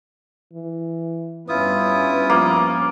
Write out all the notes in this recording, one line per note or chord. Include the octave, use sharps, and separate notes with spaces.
E3
G2 B3 C#4 E4 F4 B4 D#6
F3 A#3